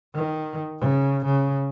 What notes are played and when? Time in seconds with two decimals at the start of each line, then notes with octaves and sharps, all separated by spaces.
0.14 D#3
0.79 C#3
1.25 C#3